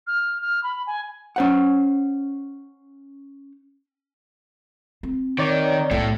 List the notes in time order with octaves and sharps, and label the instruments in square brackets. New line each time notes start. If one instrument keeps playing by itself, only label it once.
[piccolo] F6
F6
B5
G#5
[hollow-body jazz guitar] C#4 C5 F#5
[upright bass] C4
[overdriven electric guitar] D#3 [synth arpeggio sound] C#5 D5
[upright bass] B1 F#2 [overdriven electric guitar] A2 A3